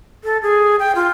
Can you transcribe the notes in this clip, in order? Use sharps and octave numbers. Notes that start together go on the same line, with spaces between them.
A4
G#4
G5
F4